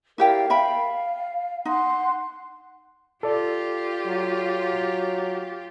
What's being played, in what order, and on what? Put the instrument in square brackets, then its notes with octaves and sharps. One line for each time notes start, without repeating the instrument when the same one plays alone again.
[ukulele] E4 G4 G5 [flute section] A#4 D5 F5
[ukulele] E5 G5 B5 [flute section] F5
[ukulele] D#4 [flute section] F#5 C6 F#6
[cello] F4 G4 [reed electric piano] A4 D5
[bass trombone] F#3